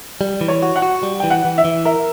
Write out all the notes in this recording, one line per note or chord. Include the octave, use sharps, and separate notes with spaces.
G3
E3
C#5
F#4
F#5
F#4
G3
E3 G5
F#5
E3
E5
E3
A#4 E5